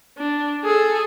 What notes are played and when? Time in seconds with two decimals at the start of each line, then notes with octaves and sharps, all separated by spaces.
0.18 D4
0.65 G#4 A4